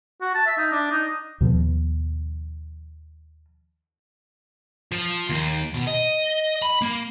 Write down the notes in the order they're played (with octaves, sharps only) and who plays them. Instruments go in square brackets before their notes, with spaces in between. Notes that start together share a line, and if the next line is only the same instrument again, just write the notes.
[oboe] F#4
A5
E5
D#4
D4
D#4
[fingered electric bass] D#2 B2 F3
[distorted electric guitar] F3
D#2
B2
D#5
B5
A#3